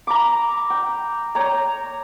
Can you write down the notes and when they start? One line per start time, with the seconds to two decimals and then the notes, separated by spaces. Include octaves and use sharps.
0.07 A#5 B5 D6
0.70 G5
1.35 C#5 G5 A#5